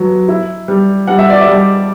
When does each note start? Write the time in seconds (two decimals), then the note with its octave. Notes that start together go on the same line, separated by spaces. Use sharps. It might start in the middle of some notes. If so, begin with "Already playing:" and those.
Already playing: F#3 B3
0.28 E4
0.68 G3
1.07 G3 F#5
1.19 E5
1.30 D5
1.41 E5
1.48 G3